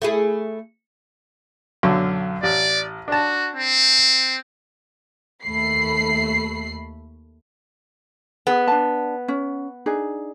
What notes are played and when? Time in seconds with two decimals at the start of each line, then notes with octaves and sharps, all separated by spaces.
0.02 A3 E4 G#4
1.83 B1 F#2 D3
2.43 A1 D5
3.08 D4 F#4 A5
3.56 C4
5.44 D#2 A3 B5 C7
8.47 B3 G#4
8.68 D4 A5
9.28 C#4
9.86 D4 D#4 G#4